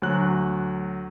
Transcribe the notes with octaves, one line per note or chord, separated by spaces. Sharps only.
D2 F#3 F#6